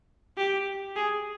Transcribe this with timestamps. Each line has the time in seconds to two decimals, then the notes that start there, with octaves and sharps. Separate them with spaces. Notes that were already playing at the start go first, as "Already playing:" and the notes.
0.37 G4
0.96 G#4